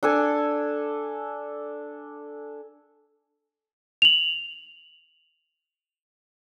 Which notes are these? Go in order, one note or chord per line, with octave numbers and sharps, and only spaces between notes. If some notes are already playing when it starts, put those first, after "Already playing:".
D4 A4 G#5
F7 F#7